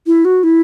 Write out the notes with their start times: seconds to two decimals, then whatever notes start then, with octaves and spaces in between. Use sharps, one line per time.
0.07 E4
0.25 F#4
0.43 E4